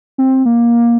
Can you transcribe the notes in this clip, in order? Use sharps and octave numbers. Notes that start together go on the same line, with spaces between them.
C4
A#3